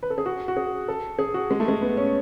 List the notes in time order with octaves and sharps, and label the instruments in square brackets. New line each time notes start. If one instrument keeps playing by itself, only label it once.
[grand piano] B4
A4
G#4
F#4
F#4
G#4
A4
G#4
F#4
G#3
A3
G#3
B3
C#4